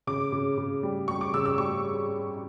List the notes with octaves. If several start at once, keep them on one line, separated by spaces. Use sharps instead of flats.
C#3 D6
C#3
C#3
G3
G3 C#6
D6
C#3 E6
E6
G3 C#6